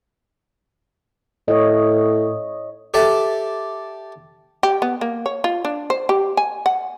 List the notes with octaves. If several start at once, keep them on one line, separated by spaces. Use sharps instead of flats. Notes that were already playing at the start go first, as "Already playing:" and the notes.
A2 C#5 D#5
G4 A4 D5 E5
G4
B3
A#3
C#5
F4
D4
C5
G4
G#5
F#5